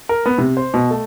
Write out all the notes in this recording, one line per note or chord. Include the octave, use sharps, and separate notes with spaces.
A#4
B3
C3
C5
B2
A3